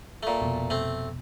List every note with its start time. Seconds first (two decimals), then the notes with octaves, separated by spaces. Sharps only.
0.23 A#2 A3
0.42 F1 B2
0.70 A3 C4